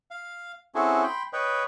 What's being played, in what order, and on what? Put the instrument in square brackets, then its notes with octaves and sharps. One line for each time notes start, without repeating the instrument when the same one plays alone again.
[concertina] F5
C4 C#4 E4 F#4 G#4 A4
G5 B5 C6
B4 C#5 D#5 G5